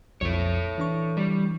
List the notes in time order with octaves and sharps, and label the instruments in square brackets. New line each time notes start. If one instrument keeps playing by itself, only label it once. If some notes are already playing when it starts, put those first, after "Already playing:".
[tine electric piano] B1 F2 F3 [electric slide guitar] A4 C#5
[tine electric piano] E3 D4 C#6
[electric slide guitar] G3